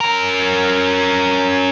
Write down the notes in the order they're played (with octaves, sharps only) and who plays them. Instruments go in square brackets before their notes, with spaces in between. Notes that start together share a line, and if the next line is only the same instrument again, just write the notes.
[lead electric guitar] C#4 A#4